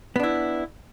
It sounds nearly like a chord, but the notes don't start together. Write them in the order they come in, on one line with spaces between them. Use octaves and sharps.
B3 D4 E4